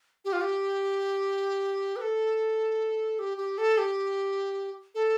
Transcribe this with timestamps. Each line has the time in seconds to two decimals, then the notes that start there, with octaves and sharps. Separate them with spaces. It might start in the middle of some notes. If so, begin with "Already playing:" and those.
0.25 G4
0.33 F4
0.41 G4
1.96 B4
2.01 A4
3.19 G4
3.38 G4
3.58 A4
3.78 G4
4.95 A4